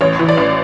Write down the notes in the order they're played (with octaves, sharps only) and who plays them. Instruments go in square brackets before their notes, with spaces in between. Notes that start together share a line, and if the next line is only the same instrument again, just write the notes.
[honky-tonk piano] A1 C#5
E3
D5
A1